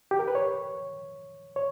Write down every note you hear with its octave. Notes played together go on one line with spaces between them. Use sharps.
G4
A#4
B4
C#5
C#5